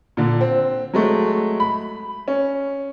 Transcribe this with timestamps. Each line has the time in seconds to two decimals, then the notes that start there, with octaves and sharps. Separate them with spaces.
0.17 A#2 D3
0.41 C4
0.93 F#3 G#3 A3
1.60 B5
2.28 C#4